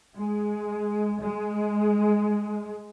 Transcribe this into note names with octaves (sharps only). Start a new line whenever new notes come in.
G#3
G#3